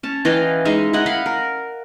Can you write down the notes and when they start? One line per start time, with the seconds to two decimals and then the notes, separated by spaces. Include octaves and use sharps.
0.03 C#4 A5
0.25 E3 D#5 F5 G5
0.65 G#3 D#4 E5 F5
0.93 E4 A#4 D#5 F#5
1.06 F5 F#5 B5
1.26 A#4